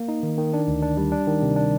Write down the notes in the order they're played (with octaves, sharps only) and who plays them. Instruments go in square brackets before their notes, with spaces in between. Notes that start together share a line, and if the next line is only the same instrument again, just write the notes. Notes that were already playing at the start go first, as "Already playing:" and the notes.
Already playing: [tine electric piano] A#3
D#4
D#3
D#3
D4
D2
D4
G3
D4
D#3
C3
D4